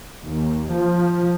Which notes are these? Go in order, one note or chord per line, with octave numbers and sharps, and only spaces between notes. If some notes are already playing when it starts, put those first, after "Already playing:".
D#2
F3